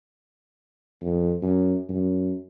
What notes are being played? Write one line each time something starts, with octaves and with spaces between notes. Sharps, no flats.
F2
F#2
F#2